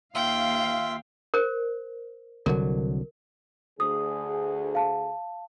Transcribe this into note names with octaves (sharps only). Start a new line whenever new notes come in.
D#2 F4 E5 F5 G5
A#4 C5
C2 D3 F#3 A#4
D2 G#4 D#6
F5 A5